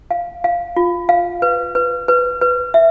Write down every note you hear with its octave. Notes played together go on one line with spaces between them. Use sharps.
F5
F5
F4
F5
B4
B4
B4
B4
E5